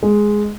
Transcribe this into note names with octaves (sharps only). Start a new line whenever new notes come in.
G#3